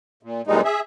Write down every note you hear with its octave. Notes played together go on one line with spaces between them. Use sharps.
A#2
F#2 A#2 E3 G3 G#3 D#4
G#4 E5